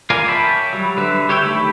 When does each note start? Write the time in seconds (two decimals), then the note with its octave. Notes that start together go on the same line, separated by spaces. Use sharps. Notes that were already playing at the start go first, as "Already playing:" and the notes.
0.10 F4 A#4 D5 F5 G#5
0.27 C#5 E5 G5 A5 B5
0.73 F#3 G3
0.97 D3 B4 E5
1.29 G4 C#5 E5 G5
1.43 D#3 A3 G4 B5